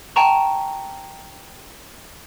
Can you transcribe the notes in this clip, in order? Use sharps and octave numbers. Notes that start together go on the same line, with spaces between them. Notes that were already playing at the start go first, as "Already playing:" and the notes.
G5 A5 A#5 C#6